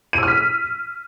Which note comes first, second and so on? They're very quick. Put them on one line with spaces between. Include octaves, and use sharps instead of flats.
D#7 E6 F6 B6